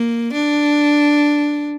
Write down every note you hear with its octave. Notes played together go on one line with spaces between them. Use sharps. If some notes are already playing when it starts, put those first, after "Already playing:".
Already playing: A#3
D4